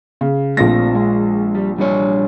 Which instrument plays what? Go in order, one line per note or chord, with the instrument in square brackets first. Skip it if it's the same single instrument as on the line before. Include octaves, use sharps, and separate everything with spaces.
[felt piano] C#3
[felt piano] A#1 F3 A#6 [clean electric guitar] A3 C4 D4
[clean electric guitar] G#3
G3
G3 D4 C#5